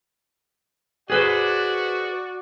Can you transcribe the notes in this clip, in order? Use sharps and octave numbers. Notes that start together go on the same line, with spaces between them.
F#4 G#4 B4 C5 D5